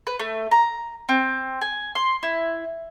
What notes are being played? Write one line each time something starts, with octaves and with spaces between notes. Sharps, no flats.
B4
A3
A#5
C4
G#5
C6
E4